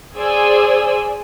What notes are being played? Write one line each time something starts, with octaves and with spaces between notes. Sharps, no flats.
G#4 C5 D5 G#5 E6